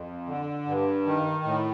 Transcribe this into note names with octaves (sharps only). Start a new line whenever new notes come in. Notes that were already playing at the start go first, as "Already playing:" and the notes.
Already playing: F2
D3
G2
D#3
A2